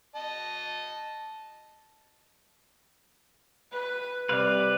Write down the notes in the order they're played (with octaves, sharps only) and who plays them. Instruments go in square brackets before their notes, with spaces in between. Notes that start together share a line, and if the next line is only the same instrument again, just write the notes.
[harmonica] D#5 A5
[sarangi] B4
[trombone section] C3 G3 [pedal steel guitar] B4 F5 [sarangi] D5